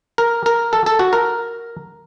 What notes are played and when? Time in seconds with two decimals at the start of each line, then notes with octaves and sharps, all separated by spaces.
0.18 A#4
0.46 A#4
0.73 A4
0.86 A4
0.99 F#4
1.13 A#4